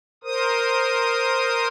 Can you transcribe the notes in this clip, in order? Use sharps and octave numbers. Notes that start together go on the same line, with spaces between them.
A#4 C5 D#6